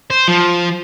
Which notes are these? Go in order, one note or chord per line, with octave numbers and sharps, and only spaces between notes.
C5
F3